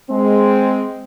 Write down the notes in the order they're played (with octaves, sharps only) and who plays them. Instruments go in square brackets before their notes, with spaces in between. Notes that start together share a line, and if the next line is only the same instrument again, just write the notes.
[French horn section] G#3 C4